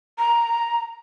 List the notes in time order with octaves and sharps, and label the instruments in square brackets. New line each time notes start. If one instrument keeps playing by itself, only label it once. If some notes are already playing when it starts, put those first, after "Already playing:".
[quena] A#5